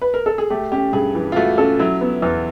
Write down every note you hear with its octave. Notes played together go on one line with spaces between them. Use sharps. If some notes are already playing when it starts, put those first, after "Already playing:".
B4
A#4
A4
G#4
A3 G4
C#4 G4
G2 G#4
E3
F4
A3 F#4
C#4 A4
F#3 E4
B3
E2